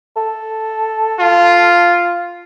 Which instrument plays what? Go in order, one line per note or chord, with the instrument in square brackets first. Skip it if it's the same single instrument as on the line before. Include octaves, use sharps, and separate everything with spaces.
[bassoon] A4
[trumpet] F4